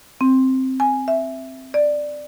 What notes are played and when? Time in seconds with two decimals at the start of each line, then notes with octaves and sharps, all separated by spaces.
0.21 C4
0.80 G#5
1.08 E5
1.74 D5